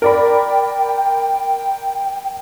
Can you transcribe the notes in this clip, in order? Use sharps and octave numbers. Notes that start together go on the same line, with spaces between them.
A#4 D5 G5 B5